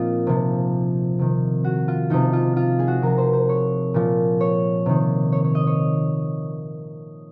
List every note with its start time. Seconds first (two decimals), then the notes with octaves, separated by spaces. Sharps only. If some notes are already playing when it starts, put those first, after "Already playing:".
Already playing: A#2 F3 A#3 C4 D#4 F4
0.27 C3 F3
1.19 C3 D#3
1.64 F#4
1.88 F4
2.10 C3 F3 D#4
2.33 F4
2.56 F4
2.79 G#4
2.88 F#4
3.02 C3 F3 A#4
3.18 C5
3.33 C5
3.49 C#5
3.94 A#2 F3
4.41 C#5
4.86 C3 D#3
5.32 C#5
5.44 C#5
5.55 D#5
5.67 C#5